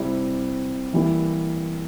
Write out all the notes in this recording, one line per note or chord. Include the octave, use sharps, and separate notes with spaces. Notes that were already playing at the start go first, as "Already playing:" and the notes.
Already playing: C3 G3 C4 E4
E3 G3 A#3 E4